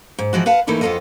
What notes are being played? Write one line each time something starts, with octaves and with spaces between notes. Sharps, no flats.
G#2
E3 F3 G#3 F#4
B4 F5 F#5 A5
E3 A3 A#3 D#4 E4 A4
F2 B3 F4 A4 A#4 D#5